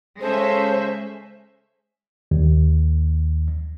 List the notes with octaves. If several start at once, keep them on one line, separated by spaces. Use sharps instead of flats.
C#3 G#3 C#4 A4 C5 E5
D#2